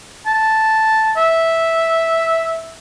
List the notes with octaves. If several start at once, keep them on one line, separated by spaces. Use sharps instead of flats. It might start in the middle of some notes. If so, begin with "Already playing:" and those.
A5
E5